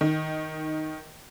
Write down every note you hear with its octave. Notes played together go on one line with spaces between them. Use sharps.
D#3